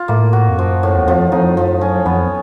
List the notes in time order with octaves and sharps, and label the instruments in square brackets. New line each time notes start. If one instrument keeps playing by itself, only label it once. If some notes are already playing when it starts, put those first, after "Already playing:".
Already playing: [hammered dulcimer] F4
[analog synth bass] A2 [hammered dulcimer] A#3
[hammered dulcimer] F#4
[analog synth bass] F2
[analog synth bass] F#2 [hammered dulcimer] F3
[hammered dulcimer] A2
[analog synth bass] E2
[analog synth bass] F2 [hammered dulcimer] F3
[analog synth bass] F2 [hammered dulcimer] D#4
[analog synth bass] F#2 [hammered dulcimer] F3
[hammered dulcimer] C#4
[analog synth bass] F2 [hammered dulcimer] B3